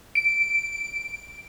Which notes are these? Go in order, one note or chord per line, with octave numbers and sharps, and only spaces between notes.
D7